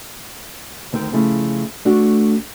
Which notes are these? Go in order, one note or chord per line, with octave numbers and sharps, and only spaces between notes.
D2 D#3 C4
C#3 F3 A3 E4
A3 D4 F#4